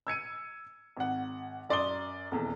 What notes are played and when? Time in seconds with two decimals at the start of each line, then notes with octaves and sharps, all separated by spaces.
0.07 E6 G#6 C#7 D#7
0.97 G#1 F#5
1.69 F#2 D5 C6 D#6 G7
2.31 D#1 E2